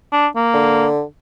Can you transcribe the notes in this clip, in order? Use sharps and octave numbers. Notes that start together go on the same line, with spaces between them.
D4
A#3
D3